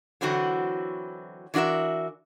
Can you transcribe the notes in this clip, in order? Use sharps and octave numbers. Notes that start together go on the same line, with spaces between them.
D3 E3 F#3 C4 E4 F#4
E3 D4 F#4 A#4 E5